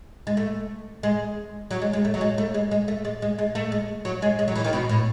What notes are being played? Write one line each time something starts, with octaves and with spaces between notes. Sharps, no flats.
G#3
A3
G#3
F#3
G#3
G#3
A3
F#3
G#3
A3
G#3
G#3
A3
G#3
G#3
G#3
A3
G#3
F#3
G#3
G#3
F#3
E3
D#3
B2
A2